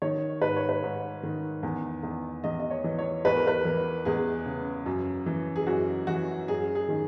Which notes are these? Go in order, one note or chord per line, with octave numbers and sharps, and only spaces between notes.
D#3 C#5
G#2 B4
C#5
B4
G#2
D#3
E2
E2
E2 D#5
D#5
C#5
E3
C#5
E2 B4
A#4
B4
E3 A#4
E2 G#4
C#3
F#2
E3
G#4
F#2 F#4
E3 F#4
F#2 G#4
G#4
D#3